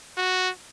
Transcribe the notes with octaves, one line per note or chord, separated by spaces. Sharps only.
F#4